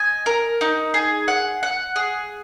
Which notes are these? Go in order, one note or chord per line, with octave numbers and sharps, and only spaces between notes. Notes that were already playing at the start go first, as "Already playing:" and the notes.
Already playing: D#5 G#5
A#4
D#4
G#4
F#5
F#5
G#4